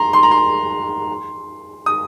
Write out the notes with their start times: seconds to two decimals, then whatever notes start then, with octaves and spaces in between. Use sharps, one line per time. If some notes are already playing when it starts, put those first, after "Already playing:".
Already playing: A#5 C6
0.13 C6
0.23 A#5
0.31 C6
1.86 D#6